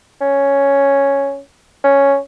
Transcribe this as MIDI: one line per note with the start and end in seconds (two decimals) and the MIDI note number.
0.21 1.38 61
1.84 2.17 61